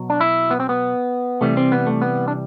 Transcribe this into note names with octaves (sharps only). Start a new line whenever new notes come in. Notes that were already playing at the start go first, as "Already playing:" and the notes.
Already playing: B2 F#3
D4
E4
B3
C4
B3
C3 E3 G3 A3
C4
B3
A3
B3
D4